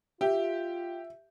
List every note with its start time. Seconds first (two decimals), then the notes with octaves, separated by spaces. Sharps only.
0.21 F4 G4 E5